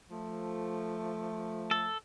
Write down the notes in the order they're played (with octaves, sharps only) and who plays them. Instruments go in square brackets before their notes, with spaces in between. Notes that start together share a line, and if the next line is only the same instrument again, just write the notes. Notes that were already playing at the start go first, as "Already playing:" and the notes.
[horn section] F3 A3
[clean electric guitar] A4